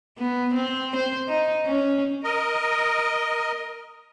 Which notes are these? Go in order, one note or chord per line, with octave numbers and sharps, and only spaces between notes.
B3
C4
C5
D#4
C#4
A#4 D#5